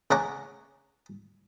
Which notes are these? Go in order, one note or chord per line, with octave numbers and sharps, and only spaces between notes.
C#3 C#5 F#5 A#5 D6